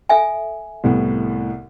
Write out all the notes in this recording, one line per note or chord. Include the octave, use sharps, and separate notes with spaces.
A4 E5 G#5
C2 A2 B3